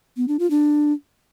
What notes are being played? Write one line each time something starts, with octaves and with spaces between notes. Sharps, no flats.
B3
D4
F4
D4